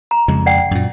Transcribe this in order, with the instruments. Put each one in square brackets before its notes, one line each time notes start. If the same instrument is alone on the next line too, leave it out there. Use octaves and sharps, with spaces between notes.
[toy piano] A#5
[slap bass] F2 C#3 G#3
[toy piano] D5 F#5 G5
[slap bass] F#2 A#2